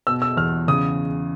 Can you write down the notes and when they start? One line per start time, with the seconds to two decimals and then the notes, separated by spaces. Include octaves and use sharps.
0.07 B2 E6
0.22 E6
0.37 E2 F6
0.68 C#3 D#6